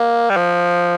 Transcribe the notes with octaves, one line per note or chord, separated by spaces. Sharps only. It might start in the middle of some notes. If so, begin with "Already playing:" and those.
Already playing: A#3
G3
F3